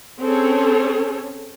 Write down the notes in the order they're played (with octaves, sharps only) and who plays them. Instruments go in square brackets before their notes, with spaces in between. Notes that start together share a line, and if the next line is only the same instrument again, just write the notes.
[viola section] C4 C#4 G#4 A4 C#5